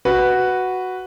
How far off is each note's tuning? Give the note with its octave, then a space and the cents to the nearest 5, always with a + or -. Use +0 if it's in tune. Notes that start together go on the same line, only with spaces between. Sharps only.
F#4 +0 B4 +0